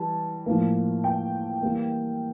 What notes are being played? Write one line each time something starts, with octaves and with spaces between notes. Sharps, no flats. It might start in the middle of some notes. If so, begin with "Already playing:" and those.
Already playing: E3 G3 A5
A2 F3 A#3
G5
E3 G3 A#3